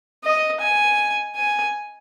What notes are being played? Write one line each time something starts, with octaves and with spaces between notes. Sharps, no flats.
D#5
G#5
G#5